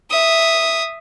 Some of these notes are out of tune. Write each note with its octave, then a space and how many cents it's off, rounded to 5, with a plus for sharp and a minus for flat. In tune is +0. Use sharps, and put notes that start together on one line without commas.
E5 +0 D#6 +0